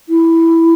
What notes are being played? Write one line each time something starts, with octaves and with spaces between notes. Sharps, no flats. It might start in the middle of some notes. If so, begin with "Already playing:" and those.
E4